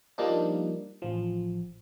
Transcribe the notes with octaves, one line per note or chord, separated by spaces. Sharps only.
F3 G3 A#3 D4 D#4
A1 F3